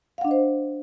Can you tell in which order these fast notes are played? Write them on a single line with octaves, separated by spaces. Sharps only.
F5 F#5 D4 D#5 C5